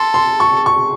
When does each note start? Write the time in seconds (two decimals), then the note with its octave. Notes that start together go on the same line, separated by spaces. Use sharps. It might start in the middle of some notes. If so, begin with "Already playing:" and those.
Already playing: A4 C6
0.14 C6
0.40 C#6
0.66 C#6